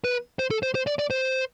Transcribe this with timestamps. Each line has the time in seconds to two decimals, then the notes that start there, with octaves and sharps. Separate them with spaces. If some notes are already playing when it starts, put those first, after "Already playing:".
0.04 B4
0.39 C5
0.51 A4
0.63 C5
0.75 C5
0.87 D5
0.99 D5
1.10 C5